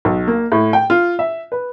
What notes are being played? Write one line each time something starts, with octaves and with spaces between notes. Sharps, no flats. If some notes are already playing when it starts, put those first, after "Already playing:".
B1
A#3
A2
G5
F4
E5
B4